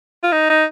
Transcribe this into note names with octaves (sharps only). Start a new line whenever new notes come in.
F4
D#4
D#4